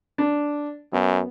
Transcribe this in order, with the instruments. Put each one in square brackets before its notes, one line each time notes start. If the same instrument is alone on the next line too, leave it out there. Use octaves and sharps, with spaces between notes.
[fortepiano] D4
[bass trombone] F#2 [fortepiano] B3